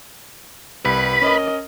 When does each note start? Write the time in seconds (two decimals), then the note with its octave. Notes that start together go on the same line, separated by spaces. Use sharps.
0.85 C2 G3 B4 B5
1.22 C#4 A#4 D#5